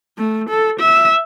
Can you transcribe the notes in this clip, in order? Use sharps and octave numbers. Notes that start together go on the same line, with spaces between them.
A3
A4
E5